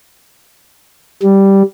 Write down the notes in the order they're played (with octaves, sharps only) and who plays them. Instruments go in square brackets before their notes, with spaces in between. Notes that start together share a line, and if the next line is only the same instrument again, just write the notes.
[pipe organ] G3